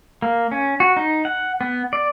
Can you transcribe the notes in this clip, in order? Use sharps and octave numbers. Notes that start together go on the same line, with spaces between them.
A#3
C#4
F#4
D#4
F#5
B3
D5